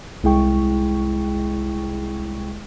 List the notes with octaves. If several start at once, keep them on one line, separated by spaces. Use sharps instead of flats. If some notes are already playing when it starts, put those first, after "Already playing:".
C2 G#3 E4 G#4 G5 C#6